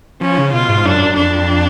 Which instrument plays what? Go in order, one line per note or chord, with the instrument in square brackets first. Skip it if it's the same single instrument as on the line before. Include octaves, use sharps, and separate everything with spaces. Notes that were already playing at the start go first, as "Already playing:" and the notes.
[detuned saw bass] F3 [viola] C#4
[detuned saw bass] C#3
[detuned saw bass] B2 [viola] F4
[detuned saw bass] G#2
[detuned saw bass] F#2 [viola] D4
[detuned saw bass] F2 [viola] D4